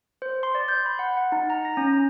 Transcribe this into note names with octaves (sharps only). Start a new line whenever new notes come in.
C5
C6
D5
G6
B5
F#5
F#5
D#4
A#5
A#6
C#4
A#5